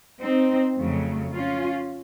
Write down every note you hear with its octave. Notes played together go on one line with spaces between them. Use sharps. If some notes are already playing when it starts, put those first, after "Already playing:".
C4 D#4
F2 C#3 F#3 A3
C#4 F4